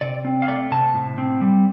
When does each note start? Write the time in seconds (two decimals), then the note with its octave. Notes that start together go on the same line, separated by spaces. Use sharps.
0.01 C3 D5
0.25 C4
0.42 F5
0.48 A3 D5
0.72 C3 A5
0.94 A2
1.18 C4
1.41 G3